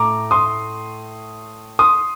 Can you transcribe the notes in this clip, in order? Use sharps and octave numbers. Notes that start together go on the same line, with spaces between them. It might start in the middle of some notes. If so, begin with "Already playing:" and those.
Already playing: A2 A3 A#5 D6
C6 D#6
C6 D#6